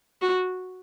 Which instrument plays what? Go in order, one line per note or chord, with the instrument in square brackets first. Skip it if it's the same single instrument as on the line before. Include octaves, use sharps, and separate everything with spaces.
[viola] F#4